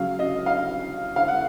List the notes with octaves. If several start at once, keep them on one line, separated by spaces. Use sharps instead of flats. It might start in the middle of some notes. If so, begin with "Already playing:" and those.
Already playing: C#3 F#3 F5
D#5
F5
F5
F#5